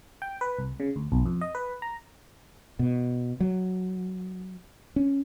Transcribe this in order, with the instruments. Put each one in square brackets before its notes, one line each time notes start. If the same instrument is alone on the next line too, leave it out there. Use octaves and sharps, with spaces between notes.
[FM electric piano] G5
B4
C2
C#3
D2
B1
F2
D#5
B4
A#5
[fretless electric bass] B2
F#3
C#4